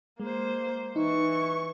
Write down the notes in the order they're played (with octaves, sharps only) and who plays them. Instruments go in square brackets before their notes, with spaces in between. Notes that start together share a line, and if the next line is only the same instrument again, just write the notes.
[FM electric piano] G#3 [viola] A#3 C5
[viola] E3 C#6 [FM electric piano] D#4